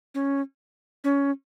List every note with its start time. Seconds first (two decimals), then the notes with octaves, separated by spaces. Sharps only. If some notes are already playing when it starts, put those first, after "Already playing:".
0.15 C#4
1.04 C#4